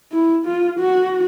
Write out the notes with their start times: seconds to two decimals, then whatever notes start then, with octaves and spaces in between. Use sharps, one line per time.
0.12 E4
0.46 F4
0.79 F#4